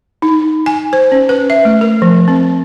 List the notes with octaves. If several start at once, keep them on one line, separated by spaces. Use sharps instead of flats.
D#4
G#5
C5
C#4
B4
E5
A3
A#4
F3
C4